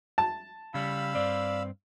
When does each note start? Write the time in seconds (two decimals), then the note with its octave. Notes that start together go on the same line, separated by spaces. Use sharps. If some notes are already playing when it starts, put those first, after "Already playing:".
0.18 A5
0.74 C#3 G3 F5 B5 E6
1.15 G2 C4 D5